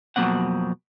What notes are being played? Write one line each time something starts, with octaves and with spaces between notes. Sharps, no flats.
F2 B2 F#3 A#3 C4 F#5